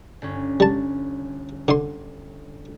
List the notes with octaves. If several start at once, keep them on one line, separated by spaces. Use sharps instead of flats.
G1 C#4
G3 A5
D3 C6